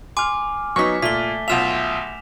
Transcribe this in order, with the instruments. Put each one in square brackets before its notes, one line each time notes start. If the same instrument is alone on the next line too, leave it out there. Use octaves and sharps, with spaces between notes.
[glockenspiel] G#5 D6 [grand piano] C6 F6
[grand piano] F#3 B3 D#4 [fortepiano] C#6 [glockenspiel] F6 B6
[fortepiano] A#2 [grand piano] A3 [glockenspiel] B6 G7
[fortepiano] B1 F4 E5 [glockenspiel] E7 F7